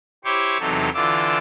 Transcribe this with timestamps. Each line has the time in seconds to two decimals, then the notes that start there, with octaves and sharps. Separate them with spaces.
0.25 E4 G4 C5 C#5 C#6 D6
0.59 E2 C3 F#3 D#4 A4
0.94 D3 E3 F4 D6 E6